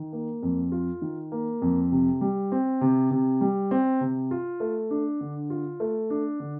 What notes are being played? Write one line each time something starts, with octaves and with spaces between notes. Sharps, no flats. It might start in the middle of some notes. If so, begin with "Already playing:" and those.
Already playing: D#3
A#3
F2
F4
D#3
A#3
F2
C3
G3
C4
C3
C3
G3
C4
C3
F4
A3
D4
D3
F4
A3
D4
D3